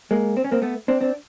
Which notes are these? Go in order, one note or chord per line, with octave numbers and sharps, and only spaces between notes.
G#3 A#3
C4
C#4
A#3 C4
A3 B3
C4 D4
C4 D4